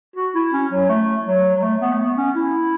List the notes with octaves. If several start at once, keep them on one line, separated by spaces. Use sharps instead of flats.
F#4
E4
C#4
F#3
A3
F#3
F#3
A3
B3
A3
B3
C#4
E4